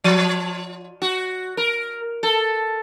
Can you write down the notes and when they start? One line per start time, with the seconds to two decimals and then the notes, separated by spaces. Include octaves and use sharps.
0.04 F3
1.02 F#4
1.57 A#4
2.23 A4